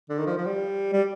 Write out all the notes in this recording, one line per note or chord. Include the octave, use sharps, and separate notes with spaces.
D3
D#3
F3
F3
G3
G3